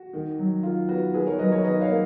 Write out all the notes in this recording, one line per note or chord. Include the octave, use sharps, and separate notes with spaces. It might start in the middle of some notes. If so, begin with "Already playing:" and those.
Already playing: F#4
D#3
F#3
D#3 F4
B3 F#4
D#3 G#4 B4
A#4 C#5
F#3 B4 D#5
A#4 C#5
D#3 B4 D#5
C#5 F5
A#3